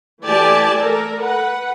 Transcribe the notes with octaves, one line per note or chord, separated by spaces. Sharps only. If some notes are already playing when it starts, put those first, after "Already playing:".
E3 A3 G4 D5 G#5 A5
A4 A#4
B4 F#5